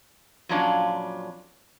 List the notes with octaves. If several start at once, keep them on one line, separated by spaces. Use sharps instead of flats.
F2 A#2 F#3 C#4 D4 F4